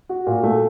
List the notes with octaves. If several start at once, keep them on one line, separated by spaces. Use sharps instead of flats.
F#4
A#2
A3